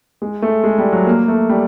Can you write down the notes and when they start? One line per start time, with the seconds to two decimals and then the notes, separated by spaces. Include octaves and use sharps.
0.22 G#3
0.42 A3
0.64 G#3
0.78 G3
0.92 F#3
1.07 A#3
1.28 A3
1.49 G3